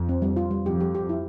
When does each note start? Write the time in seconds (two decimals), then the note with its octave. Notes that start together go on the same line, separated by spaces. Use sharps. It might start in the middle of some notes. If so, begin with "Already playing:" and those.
Already playing: F2
0.09 C4
0.22 G3
0.37 F4
0.51 G3
0.65 F2 G4
0.80 G4
0.95 G4
1.09 E4